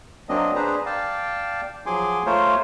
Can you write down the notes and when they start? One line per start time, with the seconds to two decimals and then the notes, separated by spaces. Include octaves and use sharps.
0.29 F#3 A#3 C4 D4 D#5
0.55 D4 G#4 B4 C5 A#5
0.86 D5 F5 G5 A5
1.86 F3 F#3 G#4 G#5 C6 D6
2.26 A3 A#3 F4 A#4 C5 C#5